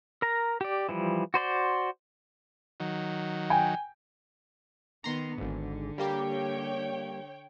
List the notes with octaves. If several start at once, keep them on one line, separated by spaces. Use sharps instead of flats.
A#4 A#5
G4 D5
E3 F3 G3
F#4 C5 D5 C6
D#3 F#3
G5 G#5
D#3 B3 A#5 C6
G#1 G#2 D3
G3 A#3 G4 C#5 G5